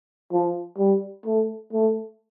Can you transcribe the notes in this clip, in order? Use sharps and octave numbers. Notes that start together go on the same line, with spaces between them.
F3
G3
A3
A3